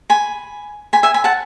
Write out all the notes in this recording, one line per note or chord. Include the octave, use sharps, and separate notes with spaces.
G#5 B5
G#5 B5
E5 G#5
G#5 B5
F#5 A5